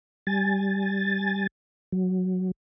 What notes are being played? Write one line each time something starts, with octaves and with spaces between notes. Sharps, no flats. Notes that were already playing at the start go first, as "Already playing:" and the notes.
G3 G#5 A6
F#3